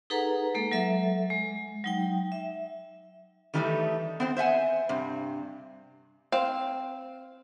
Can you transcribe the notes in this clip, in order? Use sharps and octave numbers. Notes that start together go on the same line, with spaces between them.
D#4 G#4 A4 B4 F#5 A#5
G#3 A#3 A4
F#3 A4 E5
G#3
F#3 D#4 G5
E5
D#3 E3 G3 A3 D#4
B3 C4 C5
C5 E5 F#5 G#5
G2 C3
C4 F5